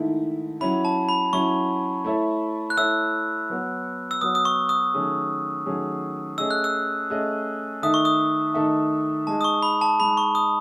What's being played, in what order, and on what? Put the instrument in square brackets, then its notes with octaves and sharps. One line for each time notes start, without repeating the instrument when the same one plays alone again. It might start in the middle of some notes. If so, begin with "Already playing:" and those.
Already playing: [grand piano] G#2 D#3 A3 E4
[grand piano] F#3 C#4 E4 [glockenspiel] B5
[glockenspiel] A5
B5
[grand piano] F#3 C#4 E4 [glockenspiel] C#6
[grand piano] A3 E4 A4 C#5 E5
[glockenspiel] F#6
[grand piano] A3 E4 A4 C#5 E5 [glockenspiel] E6
[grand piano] F#3 B3 F#4 C#5
[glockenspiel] E6
[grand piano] F#3 B3 F#4 C#5 [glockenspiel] D#6
[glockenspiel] D#6
C#6
D#6
[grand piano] D#3 F#3 A3 C#4 G#4
D#3 F#3 A3 C#4 G#4
[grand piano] A3 C#4 G#4 D#5 [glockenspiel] E6
[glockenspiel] F#6
E6
[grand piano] A3 C#4 G#4 D#5
[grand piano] D#3 A3 D#4 A4 E5 [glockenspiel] D#6
[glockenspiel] C#6
D#6
[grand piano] D#3 A3 D#4 A4 E5
[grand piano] G#3 D#4 G#4 [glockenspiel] A5
[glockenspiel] D#6
C#6
B5
A5
[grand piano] G#3 D#4 G#4 [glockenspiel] B5
[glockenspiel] C#6
D#6